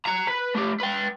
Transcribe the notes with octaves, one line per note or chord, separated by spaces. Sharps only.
F#4 A#5
B4
A3 G4
B4 G5